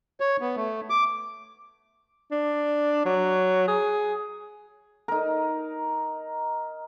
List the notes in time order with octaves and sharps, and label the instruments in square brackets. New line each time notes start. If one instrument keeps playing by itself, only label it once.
[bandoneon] C#5
B3
A3
D6
[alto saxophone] D4
F#3
G#4
[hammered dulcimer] D#4 A#4